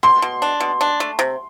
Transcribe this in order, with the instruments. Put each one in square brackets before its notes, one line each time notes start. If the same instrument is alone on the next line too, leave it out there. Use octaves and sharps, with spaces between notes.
[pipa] B2 [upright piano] C6
[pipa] B2
D4
B2
D4
A3
C3